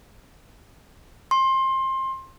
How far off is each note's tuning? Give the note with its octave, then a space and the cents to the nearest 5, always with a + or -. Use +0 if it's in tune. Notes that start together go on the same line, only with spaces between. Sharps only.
C6 +25